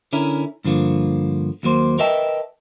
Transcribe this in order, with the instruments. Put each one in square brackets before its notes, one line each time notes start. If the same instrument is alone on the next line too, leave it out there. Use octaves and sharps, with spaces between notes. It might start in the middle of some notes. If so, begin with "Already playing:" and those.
[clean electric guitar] D3 C#4 E4 A#4
G2 D3 F3 A#3
D#2 F#3 A#3 C5
A#4 B4 D#5 E5 G5 A5